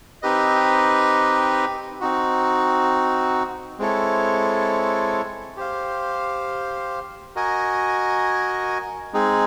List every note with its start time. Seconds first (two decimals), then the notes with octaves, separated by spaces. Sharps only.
0.22 C4 D#4 G4 B4 D#5
2.01 C4 D#4 F#4
3.79 G#3 C4 E4 A4 C#5
5.57 G4 C5 F5
7.36 F#4 A#4 D#5 G#5
9.13 G#3 C4 D#4 G#4